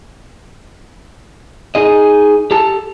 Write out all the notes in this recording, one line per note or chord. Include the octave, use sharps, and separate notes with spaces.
D#4 G#4 D#5
G4 A4 A5